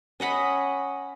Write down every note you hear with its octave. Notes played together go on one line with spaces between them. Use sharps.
C#4 D#5 F#5 B5